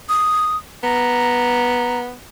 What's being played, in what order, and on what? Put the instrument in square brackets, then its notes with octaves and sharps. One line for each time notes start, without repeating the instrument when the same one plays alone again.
[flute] D#6
[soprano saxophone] B3 [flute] A#5